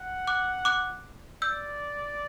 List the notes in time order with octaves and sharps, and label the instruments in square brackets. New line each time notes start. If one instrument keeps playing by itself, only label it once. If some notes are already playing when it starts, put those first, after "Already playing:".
Already playing: [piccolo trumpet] F#5
[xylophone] D6 F#6
D6 F#6
[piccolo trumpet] D5 [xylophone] E6 G6